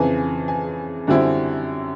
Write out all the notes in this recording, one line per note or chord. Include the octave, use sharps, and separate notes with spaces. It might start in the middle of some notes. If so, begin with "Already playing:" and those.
Already playing: F2 C#3 E3 G#5
G#5
F#2 D3 G3 C4 E4